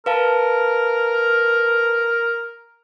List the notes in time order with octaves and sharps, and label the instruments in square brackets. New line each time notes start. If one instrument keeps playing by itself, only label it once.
[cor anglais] A#4 [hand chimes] B4 F5 A5